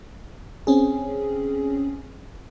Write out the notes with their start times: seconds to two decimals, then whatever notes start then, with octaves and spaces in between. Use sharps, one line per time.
0.67 C4 C#4 G#4